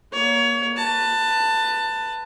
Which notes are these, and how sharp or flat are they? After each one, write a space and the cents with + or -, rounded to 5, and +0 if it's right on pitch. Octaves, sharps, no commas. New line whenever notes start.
A#3 +20 C#5 +25
B4 +0 A5 +20